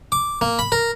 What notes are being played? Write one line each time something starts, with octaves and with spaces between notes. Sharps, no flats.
D6
A#3
B5
A#4